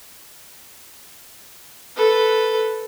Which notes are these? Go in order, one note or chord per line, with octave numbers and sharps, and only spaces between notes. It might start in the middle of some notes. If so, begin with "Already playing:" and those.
A4 B4